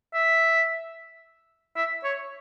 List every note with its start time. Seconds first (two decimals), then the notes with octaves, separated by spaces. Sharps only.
0.14 E5
1.77 E5
2.04 C#5